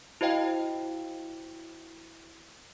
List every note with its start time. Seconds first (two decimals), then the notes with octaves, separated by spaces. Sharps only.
0.21 E4 F#4 C5 D#5 F5 G5